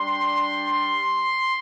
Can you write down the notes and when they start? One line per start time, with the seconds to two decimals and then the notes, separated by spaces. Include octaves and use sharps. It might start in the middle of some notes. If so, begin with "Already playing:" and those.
Already playing: G3 D4 G4 C6